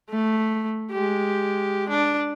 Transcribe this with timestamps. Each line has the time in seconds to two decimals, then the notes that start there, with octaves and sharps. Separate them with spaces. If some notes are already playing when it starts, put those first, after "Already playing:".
0.10 A3
0.91 G#3 G4
1.89 D4